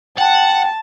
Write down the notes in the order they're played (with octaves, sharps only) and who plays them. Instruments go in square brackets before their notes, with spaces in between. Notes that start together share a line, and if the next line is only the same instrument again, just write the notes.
[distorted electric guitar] F#5 [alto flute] G5 [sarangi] A5